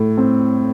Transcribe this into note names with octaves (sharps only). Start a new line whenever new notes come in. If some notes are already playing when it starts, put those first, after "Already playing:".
Already playing: A2
C4